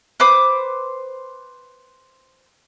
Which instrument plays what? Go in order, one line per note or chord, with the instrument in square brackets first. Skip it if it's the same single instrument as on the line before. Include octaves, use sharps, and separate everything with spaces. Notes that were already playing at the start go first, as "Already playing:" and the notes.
[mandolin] B4 C5 D6